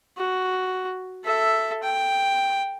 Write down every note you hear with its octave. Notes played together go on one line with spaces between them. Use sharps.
F#4
A4 E5
G5